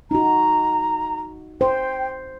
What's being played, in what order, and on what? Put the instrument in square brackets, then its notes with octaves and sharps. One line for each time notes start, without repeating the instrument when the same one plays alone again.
[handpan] D#4 F#4 [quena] A#5
[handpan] C5 [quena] G5